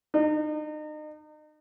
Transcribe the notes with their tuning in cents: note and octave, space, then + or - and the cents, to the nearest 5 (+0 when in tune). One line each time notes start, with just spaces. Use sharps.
D#4 -35